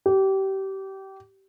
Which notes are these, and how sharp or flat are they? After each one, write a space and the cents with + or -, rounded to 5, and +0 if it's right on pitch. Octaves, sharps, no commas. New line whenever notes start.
G4 -25